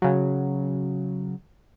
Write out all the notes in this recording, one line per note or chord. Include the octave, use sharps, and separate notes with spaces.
C#3 F#3